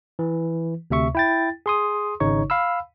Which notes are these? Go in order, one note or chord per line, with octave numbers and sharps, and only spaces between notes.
E3
D2 C3 E5 C#6
E4 G5 A6
G#4 C6 D#6
G#1 C#3 D#4 C#5 C#6
F5 B5 E6